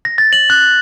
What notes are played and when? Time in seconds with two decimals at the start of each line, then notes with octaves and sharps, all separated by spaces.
0.05 A#6
0.18 A6
0.33 F#7
0.50 F#6